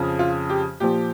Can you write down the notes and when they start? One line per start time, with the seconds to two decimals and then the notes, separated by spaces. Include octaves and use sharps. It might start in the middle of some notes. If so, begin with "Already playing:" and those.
Already playing: F2 C#3 F3
0.19 F4
0.50 G4
0.80 A#2 F3 G4